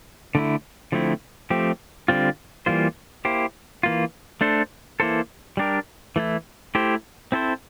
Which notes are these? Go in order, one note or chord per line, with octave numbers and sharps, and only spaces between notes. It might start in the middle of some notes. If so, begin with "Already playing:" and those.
D3 A3 E4
D3 F3 A3 C4 E4
F3 A3 C4 G4
D3 G3 C4 F4
E3 G3 A#3 F4 C5
A#3 E4 G4 C5
E3 A#3 F4
A3 D4 A4 C5
E3 A#3 E4 A4 C5
G3 D4 G4 A#4
E3 A3 E4
A3 E4 G4 C5
C4 E4 A4 C5